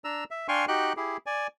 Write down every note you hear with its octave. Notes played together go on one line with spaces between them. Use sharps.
D4 A#5 E6
E5
D4 F5 G5 G#5 C6 C#6
D#4 F#4 G4 G5 F#6
E4 G4 G#4
D5 G#5